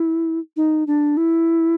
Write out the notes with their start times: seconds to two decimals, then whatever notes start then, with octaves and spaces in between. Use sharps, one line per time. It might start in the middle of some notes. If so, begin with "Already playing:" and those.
Already playing: E4
0.56 D#4
0.87 D4
1.17 E4